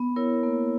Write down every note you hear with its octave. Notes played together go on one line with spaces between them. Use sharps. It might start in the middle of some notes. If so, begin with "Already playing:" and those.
Already playing: B3
E4 A#4 C#5
A#3